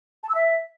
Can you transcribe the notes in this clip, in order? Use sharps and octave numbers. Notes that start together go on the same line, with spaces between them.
A5
E6
E5